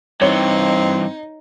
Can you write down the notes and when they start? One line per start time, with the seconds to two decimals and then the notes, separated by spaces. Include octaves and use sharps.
0.22 G2 E3 C4 D#4 C#5